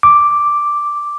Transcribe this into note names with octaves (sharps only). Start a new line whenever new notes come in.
D6